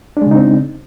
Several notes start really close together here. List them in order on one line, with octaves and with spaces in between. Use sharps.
D4 G#3 C#3 D#4 C4